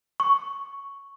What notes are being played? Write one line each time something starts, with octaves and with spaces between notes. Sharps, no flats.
C#6